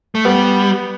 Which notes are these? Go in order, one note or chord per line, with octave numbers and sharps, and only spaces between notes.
A3
G3 B3